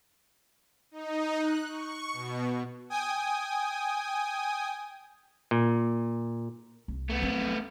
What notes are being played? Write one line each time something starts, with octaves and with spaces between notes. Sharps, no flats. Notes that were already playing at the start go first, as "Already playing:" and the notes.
D#4
F#6
C#6
B2
G5 G#5 D#6
A#2
C2
A3 B3
F#3 C4